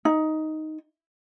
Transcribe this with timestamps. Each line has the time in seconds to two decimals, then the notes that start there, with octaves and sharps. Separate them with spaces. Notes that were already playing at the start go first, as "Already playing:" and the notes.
0.05 D#4